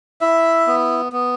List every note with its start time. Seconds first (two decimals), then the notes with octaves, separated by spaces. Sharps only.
0.21 E4 E5
0.67 B3
1.12 B3